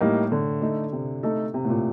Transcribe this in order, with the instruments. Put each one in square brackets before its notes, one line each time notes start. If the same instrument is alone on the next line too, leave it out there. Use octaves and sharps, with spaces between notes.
[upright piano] A2 [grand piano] G3 A#3 D#4
[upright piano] D3
[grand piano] A3 D#4 A4
[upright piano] C3
[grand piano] A3 D#4 A4
[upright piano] C3
A2
A#2